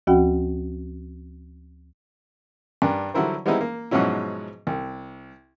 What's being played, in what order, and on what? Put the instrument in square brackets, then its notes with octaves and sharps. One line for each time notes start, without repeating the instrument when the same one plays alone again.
[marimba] D2 F3 C#4 F#4 F#5 G5
[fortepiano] G2 D4 A#4
D3 F#3 G3 E4 A#4 C5
G3 G#3 B3 C4 D#4 E4
A#3
G#2 B2 F3 F#3 C#4 E4
C2